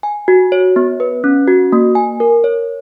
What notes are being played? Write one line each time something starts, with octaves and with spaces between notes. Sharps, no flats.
G#5
F#4
C#5
B3
B4
C#4
F#4
A#3
G#5
A#4
C#5